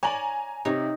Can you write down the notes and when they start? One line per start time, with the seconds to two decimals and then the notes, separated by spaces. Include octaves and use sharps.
0.03 C#5 D5 G#5 A#5 F#7
0.65 C3 D#4 C#5